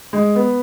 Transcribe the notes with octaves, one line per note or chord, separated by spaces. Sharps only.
G#3
B3